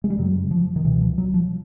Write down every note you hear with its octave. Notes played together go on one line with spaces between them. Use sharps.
G#3
G3
F#2 C#3 F#3
F3
D#3
C#2 B2 E3
F3
F#3
F3